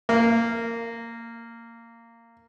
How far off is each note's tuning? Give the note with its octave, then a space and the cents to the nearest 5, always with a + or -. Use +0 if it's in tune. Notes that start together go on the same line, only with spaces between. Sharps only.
A#3 -15